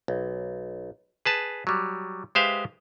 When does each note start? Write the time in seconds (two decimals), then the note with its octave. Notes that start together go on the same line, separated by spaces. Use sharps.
0.08 B1
1.25 G#4 B4 A5
1.67 F#3 G3
2.35 G#3 G4 B4 C5 E5 F5